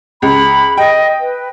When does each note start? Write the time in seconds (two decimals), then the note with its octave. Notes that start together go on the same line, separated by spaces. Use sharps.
0.22 C#2 B5
0.77 D#5 G5
1.20 B4